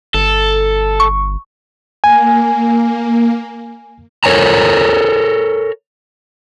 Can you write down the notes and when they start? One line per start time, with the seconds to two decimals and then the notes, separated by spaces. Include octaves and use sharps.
0.14 G1 A4
1.00 C#6
2.04 A#3 G#5
4.24 A4 A#4 C#5 G#5 A#5